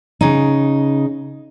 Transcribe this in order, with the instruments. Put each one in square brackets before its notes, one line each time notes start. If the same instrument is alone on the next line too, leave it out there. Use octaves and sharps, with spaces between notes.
[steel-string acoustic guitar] C#3 D#4